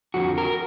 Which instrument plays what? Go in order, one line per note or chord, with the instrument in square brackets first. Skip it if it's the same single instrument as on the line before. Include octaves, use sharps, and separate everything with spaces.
[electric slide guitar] F2 D3 F3 F#4
A#4